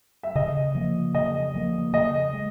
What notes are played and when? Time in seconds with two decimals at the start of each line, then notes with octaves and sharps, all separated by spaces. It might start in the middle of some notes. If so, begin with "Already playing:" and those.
0.23 E5
0.35 C#3 D#5
0.75 F3 A#3
1.14 C#3 D#5
1.54 F3 A#3
1.93 C#3 D#5
2.33 G#3